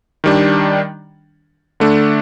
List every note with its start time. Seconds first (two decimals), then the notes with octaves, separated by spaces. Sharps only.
0.24 D#3 G3 D4
1.80 D3 A3 D4